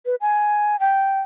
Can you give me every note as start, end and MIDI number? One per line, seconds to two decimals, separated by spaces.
0.06 0.15 71
0.21 0.79 80
0.80 1.20 79